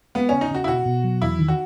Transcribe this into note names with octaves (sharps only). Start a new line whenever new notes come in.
G#3 B3
C#3 C#4
D#4
C#3 F#4
E4
B2 F#4
B2
F#3
E2 E4
D#3
F#4